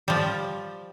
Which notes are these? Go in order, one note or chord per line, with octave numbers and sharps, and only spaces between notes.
F3 G3